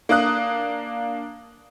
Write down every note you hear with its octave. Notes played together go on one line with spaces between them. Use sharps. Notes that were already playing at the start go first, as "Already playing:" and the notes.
A#3 D4 D#6 F#6